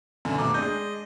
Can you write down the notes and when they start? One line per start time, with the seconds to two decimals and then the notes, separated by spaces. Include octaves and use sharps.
0.25 F#2 B2 D3 E3
0.38 D#1 B2 A3 A#5 D6
0.54 G#3 D4 D#5 G6